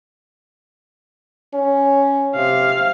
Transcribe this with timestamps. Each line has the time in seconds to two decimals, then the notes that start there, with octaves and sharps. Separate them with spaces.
1.54 C#4
2.35 C3 F5